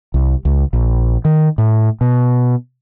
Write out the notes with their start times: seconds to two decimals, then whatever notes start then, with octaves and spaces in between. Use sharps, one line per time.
0.14 C2
0.45 C#2
0.73 A#1
1.25 D#3
1.58 A2
2.01 B2